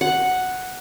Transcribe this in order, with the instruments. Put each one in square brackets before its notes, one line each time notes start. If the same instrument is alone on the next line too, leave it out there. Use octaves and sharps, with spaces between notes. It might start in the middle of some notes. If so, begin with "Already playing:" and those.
[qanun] F#5